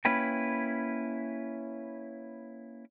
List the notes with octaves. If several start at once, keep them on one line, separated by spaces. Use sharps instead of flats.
A#3 C#4 E4 B4 G5